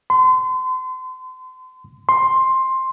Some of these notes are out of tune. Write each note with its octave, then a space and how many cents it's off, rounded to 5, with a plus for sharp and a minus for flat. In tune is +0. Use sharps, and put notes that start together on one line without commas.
C6 -35
C6 +10